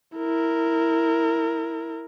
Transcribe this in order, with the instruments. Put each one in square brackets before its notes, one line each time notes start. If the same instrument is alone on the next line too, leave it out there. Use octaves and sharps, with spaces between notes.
[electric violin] E4 A#4